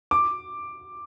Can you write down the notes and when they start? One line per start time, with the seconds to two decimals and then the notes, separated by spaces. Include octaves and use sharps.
0.11 D6